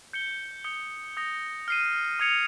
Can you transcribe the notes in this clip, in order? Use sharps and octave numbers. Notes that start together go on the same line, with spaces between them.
G6 C#7 G7
D#6 G6 C#7 G7
D#6 G6 A#6
F6 C7 D#7
D#6 G#6 C#7 F7